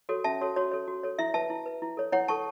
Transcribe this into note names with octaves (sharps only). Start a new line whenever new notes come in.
F#4 A4 C#5
C#4 E5 A5
F#4 A4 C#5
F#4 C#5
A4 C#5
F#4
A4 C#5
E4 E5
B4 E5 A5
E4
B4
E4
A4 C#5
E4 C#5 F#5
A4 C#5 A5 C#6